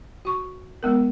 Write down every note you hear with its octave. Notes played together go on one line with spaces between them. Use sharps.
F#4 C#6
G#3 B3 A#4